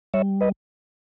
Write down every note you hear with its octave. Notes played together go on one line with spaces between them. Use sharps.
G3 C#5 E5
B4 D#5